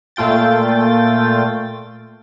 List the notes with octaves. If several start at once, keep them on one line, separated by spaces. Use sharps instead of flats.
A#2 A3 F4 G5 A6